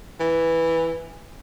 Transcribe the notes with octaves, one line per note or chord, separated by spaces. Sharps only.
E3